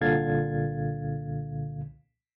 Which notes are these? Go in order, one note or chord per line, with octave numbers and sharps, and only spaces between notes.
C2 A#2 D3 F5 G#6 A6